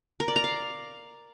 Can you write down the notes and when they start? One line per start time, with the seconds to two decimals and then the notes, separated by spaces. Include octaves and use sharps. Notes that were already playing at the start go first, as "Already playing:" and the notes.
0.20 A#4
0.28 D5
0.36 A#5
0.44 F5